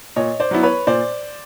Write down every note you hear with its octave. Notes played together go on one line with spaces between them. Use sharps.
A#2 C#5 D#5
C5 D5
F#3 B3 E4
B4 C#5
A#2 C5 D5